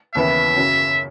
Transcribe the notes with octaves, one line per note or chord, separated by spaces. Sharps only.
D#2 C#3 E3 B3 E4 E5
F#2 C#3 F#3